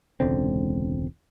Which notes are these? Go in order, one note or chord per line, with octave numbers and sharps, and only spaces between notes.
E1 C#2 D3 C4